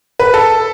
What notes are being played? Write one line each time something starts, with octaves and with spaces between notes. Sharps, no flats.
B4
A4